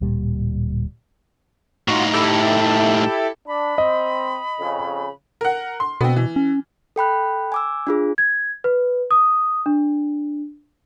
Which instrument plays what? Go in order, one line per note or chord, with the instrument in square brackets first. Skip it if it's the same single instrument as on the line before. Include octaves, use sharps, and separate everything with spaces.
[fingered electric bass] D1 A#2 G3
[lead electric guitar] A2 D#4 [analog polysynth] F4 F#4
[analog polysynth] E4 G4 A4
[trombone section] D4 [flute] B5
[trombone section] C4 [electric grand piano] D#5
[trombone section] F2 C#3
[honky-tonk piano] A#4 F#5
C6
[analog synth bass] B2 [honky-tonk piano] B3 C4
[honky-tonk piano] E3
[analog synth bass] C#4
[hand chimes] A4 G5 B5 F#6
G#5 D6 E6
D4 F4 G#4
[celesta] G#6
B4
D#6
D4